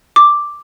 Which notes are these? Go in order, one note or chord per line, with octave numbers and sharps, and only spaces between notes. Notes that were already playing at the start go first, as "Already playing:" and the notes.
D6